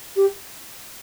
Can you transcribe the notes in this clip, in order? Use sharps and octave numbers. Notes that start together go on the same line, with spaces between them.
G4